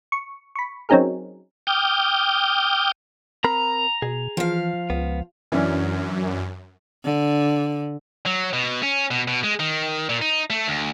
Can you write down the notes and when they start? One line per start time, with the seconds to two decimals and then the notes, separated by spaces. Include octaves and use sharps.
0.12 C#6
0.55 B5 C#6
0.89 F#3 C4 C#4 D#4 G#4 A#4
1.67 G5 D6 D#6 F6 G6
3.44 C4 A#4 A#5 B5
4.02 B2 G#4
4.37 E3 F3 F5
4.90 C#2 B3
5.52 F#2 E3 C#4 D4
7.05 D3
8.26 F#3
8.53 B2
8.83 C#4
9.11 B2
9.28 B2
9.44 G#3
9.59 D#3
10.09 A#2
10.22 D#4
10.50 A3
10.68 D2